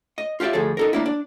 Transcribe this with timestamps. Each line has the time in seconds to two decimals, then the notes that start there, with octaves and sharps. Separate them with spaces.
0.18 D#5
0.40 F4 G4 A#4 D5 E5
0.53 D2 F3 G#4 A4
0.77 D#4 A4 A#4
0.93 A#3 D4 E4
1.06 D4